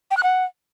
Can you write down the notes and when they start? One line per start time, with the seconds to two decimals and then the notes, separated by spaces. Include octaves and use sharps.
0.11 G5
0.17 F#6
0.23 F#5